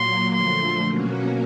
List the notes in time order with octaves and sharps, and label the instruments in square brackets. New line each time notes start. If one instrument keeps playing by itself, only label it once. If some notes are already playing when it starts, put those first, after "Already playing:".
Already playing: [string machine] A#2 F#3 A#3 [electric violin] C6
[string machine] D3 F3 A3 [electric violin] C6
[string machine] B2 F#3 A#3 C#4 F#4